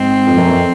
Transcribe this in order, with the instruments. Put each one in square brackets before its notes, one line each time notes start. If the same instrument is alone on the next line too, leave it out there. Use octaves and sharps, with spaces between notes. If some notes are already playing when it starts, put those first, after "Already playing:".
Already playing: [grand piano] G#2 [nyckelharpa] C4
[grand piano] F2
F#2
F2